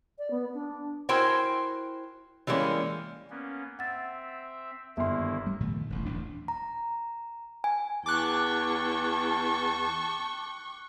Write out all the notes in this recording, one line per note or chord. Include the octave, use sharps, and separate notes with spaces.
D5
B3
D4
E4 F#4 A#4 C5 G5 G#5
E3 G3 G#3 A#3 C#4
A#3 B3 C#4
C4 E5 F#5 A6
G1 D#3 A#3 E4 E5 C6
G3
A#2 D#3 F3 A3
E1 A1 E2
D#1 A1 D2 D4
A#5
G#5
E2 G5 A5 C#6 D6 F#6